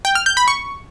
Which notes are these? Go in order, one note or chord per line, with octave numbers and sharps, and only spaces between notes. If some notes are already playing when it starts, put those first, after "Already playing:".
G5
F6
G6
B5
C#6